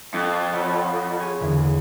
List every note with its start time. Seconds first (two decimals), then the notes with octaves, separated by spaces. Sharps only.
0.14 F2
0.53 C#5 F#5 B5
1.20 F4 G#4 C#5
1.40 F#1 E2 D3